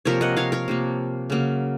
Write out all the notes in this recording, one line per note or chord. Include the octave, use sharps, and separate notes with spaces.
C3 F3 A#3 A#4 C#5
D#5 F#5
C#5 F5
A#4 C#5
C3 F3 A#3
C#3 F#3 A#3